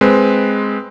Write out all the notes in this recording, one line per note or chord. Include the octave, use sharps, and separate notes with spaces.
G#3 C4 B4